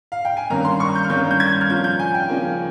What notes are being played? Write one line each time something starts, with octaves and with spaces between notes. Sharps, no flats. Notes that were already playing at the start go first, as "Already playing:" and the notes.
F5
G5
G#5
G2 D#3 A#3 C#4 A#5
C6
C#6
G6
F6
G2 D#3 A#3 C#4 G6
G6
G#6
F6
C#3 F3 A#3 C#4 G6
G6
G#5
G5
C#3 F3 A#3 C#4